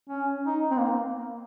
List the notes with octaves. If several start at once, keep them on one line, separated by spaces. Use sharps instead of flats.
C#4
D#4
C4
A#3